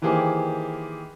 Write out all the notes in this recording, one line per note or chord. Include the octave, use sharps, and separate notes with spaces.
D#3 E3 A#3 G4 G#4 C5